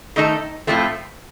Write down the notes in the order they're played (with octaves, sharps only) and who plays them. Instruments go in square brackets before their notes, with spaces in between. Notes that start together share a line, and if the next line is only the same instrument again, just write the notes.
[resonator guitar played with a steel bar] D#3 A3 D#4 A4
A2 F3 A3 C4